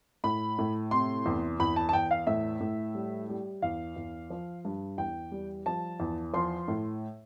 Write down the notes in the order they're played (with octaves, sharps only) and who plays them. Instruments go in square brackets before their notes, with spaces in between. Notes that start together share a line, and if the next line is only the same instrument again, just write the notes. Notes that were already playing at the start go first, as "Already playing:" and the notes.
[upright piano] A2 B5
A2
C3 C6
E2
E2 B5
A5
A5
E2 G5
F5
A2 E5
A2
G3
G3
E2 F5
E2
F3
G2
E2 G5
G3
F3 A5
E2
F3 C6
A2